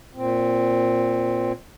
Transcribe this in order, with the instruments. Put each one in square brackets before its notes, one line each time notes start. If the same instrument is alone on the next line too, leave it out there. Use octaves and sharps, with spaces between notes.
[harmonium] A#2 C4